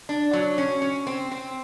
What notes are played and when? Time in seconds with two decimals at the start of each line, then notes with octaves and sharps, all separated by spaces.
0.09 D4
0.33 F#3
0.58 C#4
0.82 C#4
1.07 C4
1.32 C4